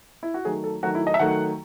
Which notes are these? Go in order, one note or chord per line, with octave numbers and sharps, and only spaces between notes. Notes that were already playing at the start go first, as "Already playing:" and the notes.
E4
F#4
D#3 F#3 A3 G#4
A4
D#3 F#3 A3 F#4
E4
D#5
E5
D#3 F#3 A3 F#5